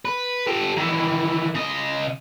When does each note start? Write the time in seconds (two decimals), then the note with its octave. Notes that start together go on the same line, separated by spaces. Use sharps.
0.05 B4
0.47 G4 A4
0.77 D#3 E3
1.55 C#3 D#5